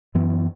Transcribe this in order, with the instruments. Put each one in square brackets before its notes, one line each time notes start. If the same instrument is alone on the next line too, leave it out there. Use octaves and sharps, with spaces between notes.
[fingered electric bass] F#2 E3 B3